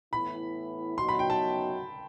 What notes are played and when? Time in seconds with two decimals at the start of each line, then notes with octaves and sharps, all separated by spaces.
0.13 A2 E3 B3 E4 B5
0.98 F#2 F#3 B3 D#4 F#4 C6
1.09 B5
1.19 G5
1.30 A5